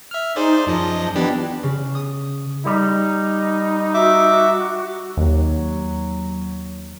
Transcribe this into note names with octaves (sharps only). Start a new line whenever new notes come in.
E5 F6
D#4 G#4 C5 D5
F#2 F3 D#5 A5
E3 B3 D4 G4
C#3
D#6
G3 D#4
F#4 E5 D6
D#2 F#3